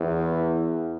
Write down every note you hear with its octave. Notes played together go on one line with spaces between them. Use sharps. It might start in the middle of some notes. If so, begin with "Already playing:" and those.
Already playing: E2